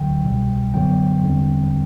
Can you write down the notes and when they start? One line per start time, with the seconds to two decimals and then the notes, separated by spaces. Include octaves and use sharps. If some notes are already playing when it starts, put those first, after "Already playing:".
Already playing: D2 D3 F#3 G5
0.24 C2 B2 G3
0.74 F#2 D3 F#3 B3 G5
1.23 E2 D3 G3 C4